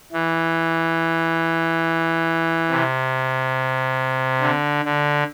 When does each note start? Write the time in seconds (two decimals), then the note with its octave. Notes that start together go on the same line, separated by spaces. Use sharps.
0.13 E3
2.70 C3
4.41 D3
4.85 D3